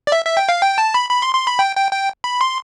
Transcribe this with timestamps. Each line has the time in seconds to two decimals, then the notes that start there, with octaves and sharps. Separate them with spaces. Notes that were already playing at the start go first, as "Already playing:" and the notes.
0.07 D5
0.12 E5
0.25 E5
0.37 G5
0.49 F5
0.61 G5
0.78 A5
0.94 B5
1.10 B5
1.22 C6
1.35 C6
1.47 B5
1.59 G5
1.76 G5
1.92 G5
2.24 B5
2.41 C6